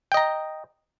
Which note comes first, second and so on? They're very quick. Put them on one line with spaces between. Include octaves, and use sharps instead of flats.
G5 D#5 A#5